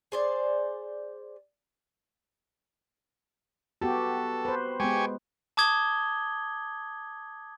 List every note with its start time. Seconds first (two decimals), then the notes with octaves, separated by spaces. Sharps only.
0.12 G#4 C5 D5
3.82 B3 F#4 G4 A4
4.45 B4 C5
4.80 G#3 B3 G4 G#5 C#6
5.57 A5 D6 D#6 G#6 G7